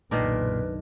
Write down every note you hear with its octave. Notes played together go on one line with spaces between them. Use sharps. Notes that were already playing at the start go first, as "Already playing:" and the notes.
F#1 B1 A#2 D#3 D4 A#4 B4